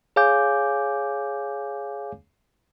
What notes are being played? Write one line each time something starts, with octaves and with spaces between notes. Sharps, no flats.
G#4 C#5 F5 G#5 D6 G6